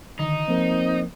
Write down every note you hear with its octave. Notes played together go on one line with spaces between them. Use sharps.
D3 D#3 D#4
F3 A#3 C4 A#4